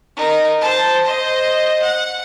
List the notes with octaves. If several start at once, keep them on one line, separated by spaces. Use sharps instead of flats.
D#4 A#4
C5 A5
C5 D#5
F#5